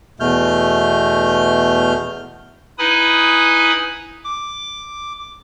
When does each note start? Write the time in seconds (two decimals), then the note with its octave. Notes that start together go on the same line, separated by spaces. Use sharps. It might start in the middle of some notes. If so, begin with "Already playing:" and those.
0.20 E2 B2 A3 F6 G6
2.79 D#4 E4 B4 G#5 B5 D#6
4.24 D6